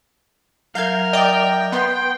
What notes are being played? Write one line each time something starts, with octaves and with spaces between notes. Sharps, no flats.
F#3 A#4 E5 F5 G6 G#6
D5 D#5 G5
B3 C6